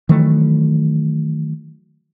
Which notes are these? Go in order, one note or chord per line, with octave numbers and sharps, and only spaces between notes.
D#3 E3 F#3 A3